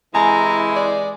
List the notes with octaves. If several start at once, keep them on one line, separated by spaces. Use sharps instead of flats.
C3 E3 G#3 E4 G#5 A#5
D5